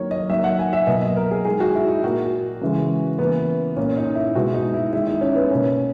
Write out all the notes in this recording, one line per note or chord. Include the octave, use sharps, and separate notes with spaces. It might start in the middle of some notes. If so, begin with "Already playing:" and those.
Already playing: D#3 F#3 A#3 C#5
D#5
D#3 F#3 A#3 E5
F#5
G#5
E5
B2 F#3 A#3 D#5
D#5
A#4
G#4
D#3 G#3 G#4
F#4
E4
D#4
A#2 A#3 F#4
C#3 E3 G#3
C#3 E3 A#3 B3
A#2 A#3 C#4
D#4
E4
B2 G#3 F#4
D#4
E4
D#3 G#3 E4
D#4
C#4
B3
B2 A#3 C#4